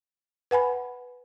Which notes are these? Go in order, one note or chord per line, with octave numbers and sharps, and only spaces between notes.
B4 F#5 G#5 B5